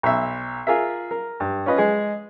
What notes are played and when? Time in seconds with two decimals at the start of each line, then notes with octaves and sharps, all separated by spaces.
0.03 B1 E5
0.67 F4 G#4 A#4 E5
1.11 A#4
1.40 G2
1.66 C#4 F4 B4 D#5
1.78 G#3 G#4